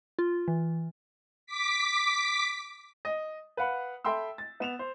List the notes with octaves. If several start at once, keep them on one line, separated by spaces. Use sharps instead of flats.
F4
E3
D6 B6
D#5
B4 F5 F#5 B5
A4 E5 G5 B5 C6 E6
A6
B3 E7 F7
C5